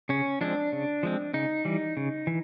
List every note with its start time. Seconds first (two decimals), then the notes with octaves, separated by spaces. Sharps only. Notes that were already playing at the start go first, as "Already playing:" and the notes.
0.09 C#3 C#4
0.41 F3 G#3 C4 D4
0.73 C#3
1.03 F3 G#3 C4
1.34 C#3 D#4
1.65 E3 G3
1.97 C#3
2.27 E3